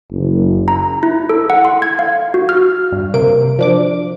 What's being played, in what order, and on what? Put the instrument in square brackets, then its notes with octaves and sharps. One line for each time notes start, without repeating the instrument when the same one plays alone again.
[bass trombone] F#1
[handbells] A#5
E4
A4
F#5
C6
G#6
F5
F#4
F6
[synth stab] G2
C3 A#3 D7
F3 D4 D6